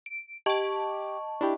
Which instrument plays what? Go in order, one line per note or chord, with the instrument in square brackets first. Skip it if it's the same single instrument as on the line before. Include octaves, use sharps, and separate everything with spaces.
[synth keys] D7
[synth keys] G4 D6 [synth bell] D#5 A5 C#6
[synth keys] D4 E4 G4